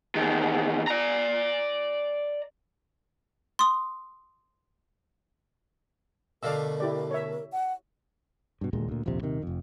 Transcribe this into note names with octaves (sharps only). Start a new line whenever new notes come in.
E2 D#3
D5 A#5
C6 D#6
B2 D3 A3 A#4 D5 F5 E6
E4 G4 D5
C#5 E5
F#5
G2 B2
D#1 D2 A#2 G#3
D2 A#2
D#1 A#1 F2 C3
D#1 C3 D#3
F1 F2